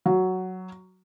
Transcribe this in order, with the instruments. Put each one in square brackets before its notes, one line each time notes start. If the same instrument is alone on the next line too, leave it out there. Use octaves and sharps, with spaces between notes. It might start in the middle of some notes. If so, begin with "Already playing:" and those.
[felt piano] F#3